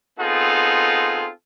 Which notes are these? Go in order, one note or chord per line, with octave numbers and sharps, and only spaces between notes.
B3 C4 D#4 F4 G#4 A4